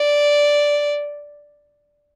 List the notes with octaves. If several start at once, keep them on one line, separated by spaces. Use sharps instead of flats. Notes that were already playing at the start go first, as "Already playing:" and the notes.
Already playing: D5